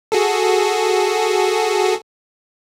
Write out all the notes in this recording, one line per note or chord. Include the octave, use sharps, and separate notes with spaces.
F#4 G#4 A4